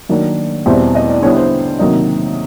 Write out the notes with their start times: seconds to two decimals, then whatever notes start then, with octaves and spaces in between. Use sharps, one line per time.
0.09 D#3 F#3 A#3 D4
0.66 E2 B2 G3 C4 E4 C5
0.95 D#5
1.09 D5
1.22 D3 G3 B3 E4 C#5
1.36 C5
1.79 C3 D#3 F#3 A#3 D#4